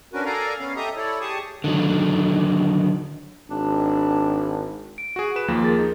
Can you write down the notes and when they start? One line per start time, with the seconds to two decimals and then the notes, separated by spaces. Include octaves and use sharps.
0.13 C#4 D4 F#4 A#4 B4
0.25 A4 A#4 D5 F5 G#5 A#5
0.59 B3 C#4 F5
0.76 G4 A4 D#5 E5 A#5 D#6
0.96 E4 A4 C#5 D5
1.21 G4 G#4 A5 C#6 D#6
1.64 D3 D#3 F#3
3.50 G#1 D4
4.98 D7
5.16 F#4 G#4
5.36 B4 E7
5.48 D#2 F3 A#3
5.63 G#4 A#4 A6
5.79 D#4